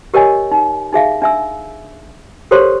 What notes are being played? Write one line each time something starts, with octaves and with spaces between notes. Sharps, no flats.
G4 A#4 C#5 D#5 G#5
D#4
D#4 G#4 E5 F5
D4 E5 E6
G4 A4 A#4 C5 C#5 C6